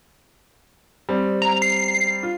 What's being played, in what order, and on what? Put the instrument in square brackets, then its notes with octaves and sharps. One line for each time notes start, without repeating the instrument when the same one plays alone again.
[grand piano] G3 C4
[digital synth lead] A#5
C7
[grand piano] F4